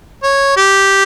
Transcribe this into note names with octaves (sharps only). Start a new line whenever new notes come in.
C#5
G4